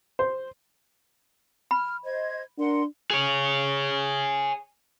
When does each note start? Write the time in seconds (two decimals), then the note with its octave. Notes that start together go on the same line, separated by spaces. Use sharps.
0.19 C5
1.71 B5 F6
2.04 C5 D#5 G#6
2.58 D4 A#4 F#5 C6
3.10 G#4 C#5